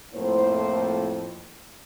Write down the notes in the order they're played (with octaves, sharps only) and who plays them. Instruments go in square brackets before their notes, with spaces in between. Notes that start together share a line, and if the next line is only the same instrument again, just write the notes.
[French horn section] F2 A2 A#3 E4 C5